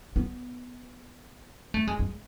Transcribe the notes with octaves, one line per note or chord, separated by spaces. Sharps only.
B3
A3
G#3
G#3